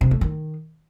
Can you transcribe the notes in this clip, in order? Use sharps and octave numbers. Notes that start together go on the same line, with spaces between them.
C3
A3
D#3